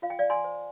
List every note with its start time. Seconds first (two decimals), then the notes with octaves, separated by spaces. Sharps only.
0.02 F4 F5
0.10 G5
0.19 D5 F5
0.30 G#5 C6
0.44 C5